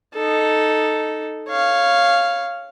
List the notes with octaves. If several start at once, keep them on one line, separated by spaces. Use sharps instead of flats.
D#4 A4
C#5 F5